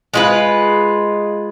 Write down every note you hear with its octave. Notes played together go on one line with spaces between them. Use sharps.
G#3 F4 B4